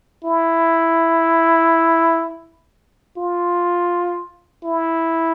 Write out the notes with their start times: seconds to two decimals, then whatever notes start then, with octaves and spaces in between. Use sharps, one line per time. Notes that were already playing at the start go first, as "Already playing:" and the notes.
0.24 E4
3.17 F4
4.63 E4